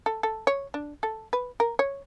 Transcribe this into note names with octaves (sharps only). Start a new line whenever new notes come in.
A4
A4
C#5
D4
A4
B4
A#4
C#5